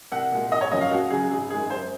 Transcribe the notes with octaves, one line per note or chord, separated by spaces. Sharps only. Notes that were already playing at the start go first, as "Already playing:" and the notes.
C2 F#5
A#2 G#3
G#1 D#5
C#5
F#2 C#3 F3 A#3 D#5
F5
C#2 F#4
C#3 F#3 G#4
G#1 G#4
F#2 D#3 G#3 G#4
F#2 C5